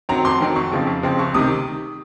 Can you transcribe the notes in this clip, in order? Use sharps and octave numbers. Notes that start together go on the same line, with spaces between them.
D#3 F#3 C4 A#5
F2 C6
D#3 F#3 C4
F2 C#6
C#3 F3 C4
F2
C#3 F3 C4
C#2 C#6
C3 D#3 D#6